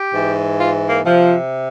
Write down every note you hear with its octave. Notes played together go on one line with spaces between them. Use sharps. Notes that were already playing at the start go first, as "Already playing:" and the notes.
Already playing: G4
G#2 E3
F4
A#3
C3 F3